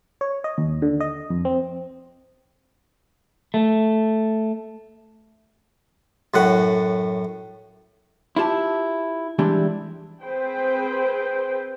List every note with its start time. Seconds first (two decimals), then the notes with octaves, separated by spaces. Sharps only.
0.21 C#5
0.44 D#5
0.58 D#2
0.82 D3
1.01 D#5
1.30 F2
1.45 C4
3.54 A3
6.34 F#2 A2 F#5
8.36 E4 F4 G4 A5
9.39 E3 G3 G#3 D4 E4 G4
10.23 C4 G#4 B4 C5 G5